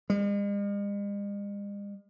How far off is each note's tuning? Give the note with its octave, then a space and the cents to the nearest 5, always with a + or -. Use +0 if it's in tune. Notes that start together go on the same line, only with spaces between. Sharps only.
G#3 -45